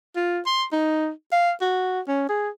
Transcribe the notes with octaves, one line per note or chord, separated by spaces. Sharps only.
F4
C6
D#4
F5
F#4
C#4
G#4